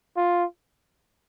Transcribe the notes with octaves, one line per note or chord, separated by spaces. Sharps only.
F4